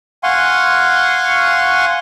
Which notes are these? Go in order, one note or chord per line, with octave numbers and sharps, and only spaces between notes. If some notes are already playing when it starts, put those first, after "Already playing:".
F5 F#5 G#5 C6 C#6